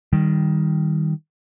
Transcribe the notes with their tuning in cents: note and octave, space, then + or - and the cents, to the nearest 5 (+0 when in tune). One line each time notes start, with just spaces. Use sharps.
D#3 +10 G3 +0